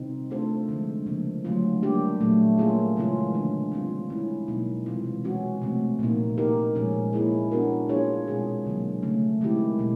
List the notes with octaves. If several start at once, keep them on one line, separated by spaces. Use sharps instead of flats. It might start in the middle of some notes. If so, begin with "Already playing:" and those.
Already playing: C3 D#3 G3 C4 D#4
A3 D4 F4 A4 C5
D3 F3 G#3
C#3 F3 A#3
D3 F#3 A3 C#4 F4
G3 A#3 D4 G4
A#2 F#3 A3
A#3 C#4 F4 G#4
C#3 E3 G#3 C#4 F4
D3 F3 A#3 D4
G3 C4 F4
G#3 C#4 E4
B2 F#3 A#3 D#4
C3 E3 G#3 C4 F4
G#3 C#4 F#4
C3 F3 A3 C4
A#2 F3 A#3 D#4
A#3 D#4 G4 A#4
A#2 F3 G#3 C#4
A#3 C#4 E4 G#4
B3 D4 F#4 A#4
A#3 D4 F4 G#4 C#5
B2 G#3 C4 F4 G#4
D3 F#3 A#3
C#3 F3 A3 C#4
D#3 G#3 C4 E4 G4
B2 G3